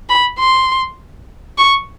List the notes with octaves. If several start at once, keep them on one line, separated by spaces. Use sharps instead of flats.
B5
C6
C#6